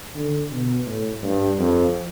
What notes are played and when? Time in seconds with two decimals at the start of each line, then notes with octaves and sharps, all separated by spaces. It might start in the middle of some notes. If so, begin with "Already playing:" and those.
0.15 D3
0.51 B2
0.86 A2
1.23 G2
1.58 F2